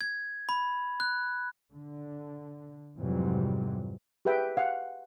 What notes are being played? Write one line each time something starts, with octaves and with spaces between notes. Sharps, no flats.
G#6
B5
F#6
D3
F2 G#2 C3 E3 F#3 G3
G4 G#4 B4 E5 G5
F5 F#5